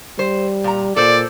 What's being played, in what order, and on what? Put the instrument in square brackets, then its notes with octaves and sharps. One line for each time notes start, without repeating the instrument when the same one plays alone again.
[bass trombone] G3 [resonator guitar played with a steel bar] C5
[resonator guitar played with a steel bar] A#2 A#5
[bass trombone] A#2 [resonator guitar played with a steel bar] A4 C5 [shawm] D5